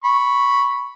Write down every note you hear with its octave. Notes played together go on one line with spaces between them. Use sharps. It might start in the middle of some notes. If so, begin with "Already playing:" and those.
B5 C#6